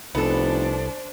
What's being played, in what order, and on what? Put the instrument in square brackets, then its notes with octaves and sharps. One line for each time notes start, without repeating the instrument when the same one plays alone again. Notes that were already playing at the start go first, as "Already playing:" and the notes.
[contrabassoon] F1 [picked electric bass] C2 [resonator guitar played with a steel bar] B3 A4 [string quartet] D4 C5